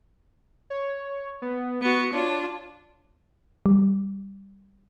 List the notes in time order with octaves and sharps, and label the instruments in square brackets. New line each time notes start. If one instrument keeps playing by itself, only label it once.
[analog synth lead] C#5
B3
[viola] B3 F#4 [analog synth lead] C#7
[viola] D4 F4 [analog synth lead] C#5
[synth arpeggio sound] G3